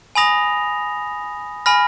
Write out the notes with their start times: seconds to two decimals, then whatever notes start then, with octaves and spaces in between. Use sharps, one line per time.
0.15 G#5 B5 D#6 A#6 F7
1.66 G#5 B5 F6 A#6